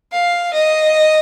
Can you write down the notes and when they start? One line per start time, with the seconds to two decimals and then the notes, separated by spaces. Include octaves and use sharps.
0.12 F5
0.53 D#5